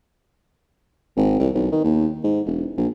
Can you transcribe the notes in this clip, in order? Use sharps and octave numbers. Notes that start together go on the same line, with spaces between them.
G#1
C2
B1
D#3
D#2
G#2
E1
A#1